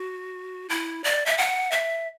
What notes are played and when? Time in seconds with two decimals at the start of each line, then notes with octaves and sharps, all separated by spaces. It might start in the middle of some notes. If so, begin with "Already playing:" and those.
Already playing: F#4
0.69 E4
1.04 D5
1.26 E5
1.38 F#5
1.71 E5